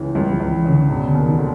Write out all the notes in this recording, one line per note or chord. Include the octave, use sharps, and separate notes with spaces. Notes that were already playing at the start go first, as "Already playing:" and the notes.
Already playing: C#2 C#3 E3
C#2 G3
F3
C#2
E3
C#3
D3
E1
D3
D#2
D#3
D3